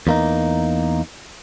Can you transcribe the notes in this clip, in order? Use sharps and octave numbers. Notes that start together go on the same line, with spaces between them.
E2 A#3 D#4